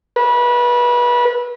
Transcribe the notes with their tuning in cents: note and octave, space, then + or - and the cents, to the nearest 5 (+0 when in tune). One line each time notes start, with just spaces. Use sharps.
B4 -30